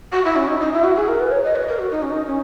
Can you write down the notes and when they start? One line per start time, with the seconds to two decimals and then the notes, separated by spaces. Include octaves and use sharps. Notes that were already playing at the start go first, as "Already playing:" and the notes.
0.12 F#4
0.25 E4
0.36 C#4
0.48 D#4
0.60 D#4
0.73 E4
0.84 F#4
0.96 G#4
1.08 A#4
1.20 B4
1.31 C#5
1.44 D#5
1.56 B4
1.68 A#4
1.79 F#4
1.92 D#4
2.02 C#4
2.12 D#4
2.27 C#4